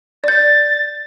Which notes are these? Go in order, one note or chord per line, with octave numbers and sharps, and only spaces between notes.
D5 G6 A6